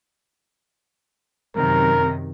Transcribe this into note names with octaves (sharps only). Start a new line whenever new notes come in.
F#2 C3 D#3 A#4